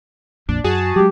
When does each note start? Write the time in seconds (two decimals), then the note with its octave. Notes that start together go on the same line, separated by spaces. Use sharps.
0.49 A#1 F2 A#2 D4
0.64 F#2 F#4 G#4 A5
0.96 F#3 G#3 G4